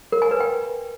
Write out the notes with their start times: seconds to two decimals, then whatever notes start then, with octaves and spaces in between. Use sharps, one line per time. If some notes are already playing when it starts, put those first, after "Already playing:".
0.12 A#4
0.22 G#5
0.31 B4
0.40 G5